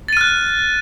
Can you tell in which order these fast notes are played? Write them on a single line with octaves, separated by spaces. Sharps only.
A6 D#7 F6 F#6